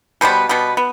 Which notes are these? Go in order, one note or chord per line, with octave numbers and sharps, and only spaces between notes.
B2 G3 B3 C5
B2 G3 B3
B3